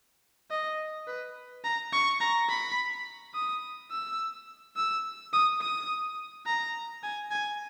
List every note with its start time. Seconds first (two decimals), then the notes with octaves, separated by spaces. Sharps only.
0.51 D#5
1.07 B4
1.64 A#5
1.92 C#6
2.20 A#5
2.49 B5
3.34 D#6
3.91 E6
4.76 E6
5.33 D#6
5.61 D#6
6.46 A#5
7.03 G#5
7.31 G#5